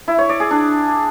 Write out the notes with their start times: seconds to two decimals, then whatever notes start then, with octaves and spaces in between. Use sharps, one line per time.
0.08 E4
0.18 C#5
0.29 D5
0.40 G#4
0.51 D4